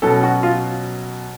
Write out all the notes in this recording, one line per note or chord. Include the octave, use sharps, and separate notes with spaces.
B2 F#3 C#4 A4
F#4
F4